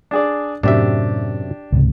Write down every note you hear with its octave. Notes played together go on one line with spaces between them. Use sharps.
D4 G#4 D5
F#2 A2 C3 D4 G4 E5
C#2 G#2 C3